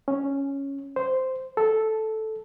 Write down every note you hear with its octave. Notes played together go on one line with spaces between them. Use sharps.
C#4
C5
A4